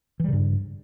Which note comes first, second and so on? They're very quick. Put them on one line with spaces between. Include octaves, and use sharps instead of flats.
E3 G3 C#3 G2